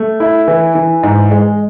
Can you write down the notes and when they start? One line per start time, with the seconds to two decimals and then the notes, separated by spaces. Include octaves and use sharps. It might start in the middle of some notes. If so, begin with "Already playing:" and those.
Already playing: A3
0.20 E4
0.48 E3
0.75 E3
1.03 G#2
1.31 G#3